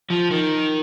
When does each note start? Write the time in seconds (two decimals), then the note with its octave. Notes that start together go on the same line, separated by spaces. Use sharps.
0.11 F3
0.31 D#3